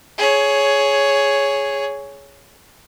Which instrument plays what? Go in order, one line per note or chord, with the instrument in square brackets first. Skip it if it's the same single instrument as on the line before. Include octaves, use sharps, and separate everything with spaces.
[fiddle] G#4 C#5